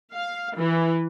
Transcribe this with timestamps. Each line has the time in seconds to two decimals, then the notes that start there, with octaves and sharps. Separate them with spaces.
0.13 F5
0.56 E3